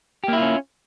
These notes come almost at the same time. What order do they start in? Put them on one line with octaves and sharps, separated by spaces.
G4 A#3 E4 F4 C#4